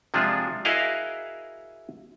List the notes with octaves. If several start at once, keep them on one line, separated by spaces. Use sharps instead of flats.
C3 F3 G#3 D4 F4 G#4
E4 F#4 G#4 A#4 D#5 F5